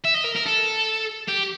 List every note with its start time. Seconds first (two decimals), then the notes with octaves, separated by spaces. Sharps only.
0.05 E5
0.15 D#5
0.24 A#4
0.36 A#4
0.46 A4
1.28 G4